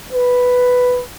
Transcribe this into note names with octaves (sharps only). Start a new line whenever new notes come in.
B4